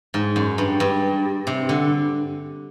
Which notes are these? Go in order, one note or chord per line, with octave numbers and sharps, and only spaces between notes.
G#2
F#2
G2
G2
C3
D3